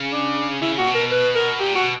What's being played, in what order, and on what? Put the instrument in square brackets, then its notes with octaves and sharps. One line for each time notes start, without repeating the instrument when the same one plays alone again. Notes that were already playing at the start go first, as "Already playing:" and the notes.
Already playing: [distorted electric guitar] C#3
[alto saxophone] D4
[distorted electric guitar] C#3 [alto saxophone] E4
[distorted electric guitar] A#2 [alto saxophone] F#4
[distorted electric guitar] B2
[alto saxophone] A#4
B4
A#4
[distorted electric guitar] A#2 [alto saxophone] G4
[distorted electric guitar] B2 [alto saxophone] F#4